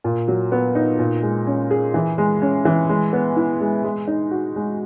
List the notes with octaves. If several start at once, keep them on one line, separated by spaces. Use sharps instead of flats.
A#2
F#3
B3
D#4
A#2
G#3
C#4
G#4
E3
G#3
C#4
E3
G#3
B3
E4
G#3
G#3
D#4
F#4
G#3